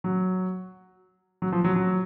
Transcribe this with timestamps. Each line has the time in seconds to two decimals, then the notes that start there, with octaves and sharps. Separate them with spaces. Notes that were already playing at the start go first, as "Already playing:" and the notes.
0.04 F#3
1.42 F#3
1.52 F3
1.64 F#3
1.76 F#3